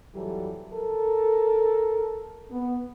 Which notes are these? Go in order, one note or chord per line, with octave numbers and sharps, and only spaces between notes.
F2 E3 F#3 G3 G4 A4
A4 A#4
B3